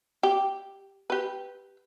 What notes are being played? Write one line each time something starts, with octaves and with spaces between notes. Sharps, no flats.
G4
G4 B4